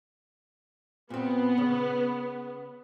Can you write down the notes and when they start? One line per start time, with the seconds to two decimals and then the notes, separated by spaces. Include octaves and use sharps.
1.10 A#2 B3 C4
1.58 C#3